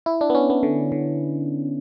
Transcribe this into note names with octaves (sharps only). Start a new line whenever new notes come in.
E4
D4
B3
C#4
B3
D3
D3